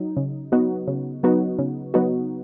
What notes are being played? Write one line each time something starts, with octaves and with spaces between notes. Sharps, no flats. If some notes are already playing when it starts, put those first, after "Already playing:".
Already playing: F#3 D#4
C#3
F#3 B3 D#4 F#4
C#3
F#3 B3 D#4 F#4
C#3
F#3 B3 D#4 F#4